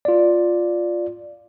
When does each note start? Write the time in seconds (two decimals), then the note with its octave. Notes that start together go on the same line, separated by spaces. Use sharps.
0.05 F4 D5